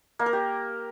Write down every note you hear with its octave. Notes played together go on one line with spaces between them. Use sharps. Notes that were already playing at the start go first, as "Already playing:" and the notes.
A#3
A#4
G4